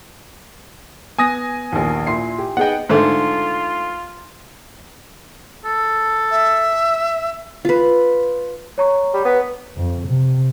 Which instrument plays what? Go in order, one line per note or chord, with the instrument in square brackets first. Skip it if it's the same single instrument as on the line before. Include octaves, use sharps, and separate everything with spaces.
[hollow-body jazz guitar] B3 [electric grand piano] G#5 D#6 A#6
[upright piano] A#1 D#2
[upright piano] A#2 C6 C7 [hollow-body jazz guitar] E4
[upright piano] G4
[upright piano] B3 G#4 D#5 [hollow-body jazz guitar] D#4 [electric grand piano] F#5 G5
[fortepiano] G#2 D3 A3 [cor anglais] F4
[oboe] A4
[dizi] E5
[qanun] F4 B4
[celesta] C#5 A#5 C#6
[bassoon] G3
B3
[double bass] F2
C3